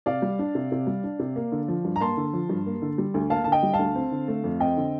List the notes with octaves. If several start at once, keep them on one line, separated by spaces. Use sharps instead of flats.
C3 D5 F5
G3
D4
C3
C3
G3
D4
C3
A#3
D3
F3
G2
A#5
A#3 A5 C6
D3
F3
G2
A#3
D3
G3
D2
A#3 F5 A5
A5
D3
D#5 G5
G3
F5 A5
D2
C4
D3
A3
F2
C4 D#5 G5
D3